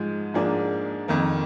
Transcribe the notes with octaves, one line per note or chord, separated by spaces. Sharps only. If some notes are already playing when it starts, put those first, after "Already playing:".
Already playing: G#2 F3 G#3
G#2 F3 A#3 D4 G#4
F2 D#3 A#3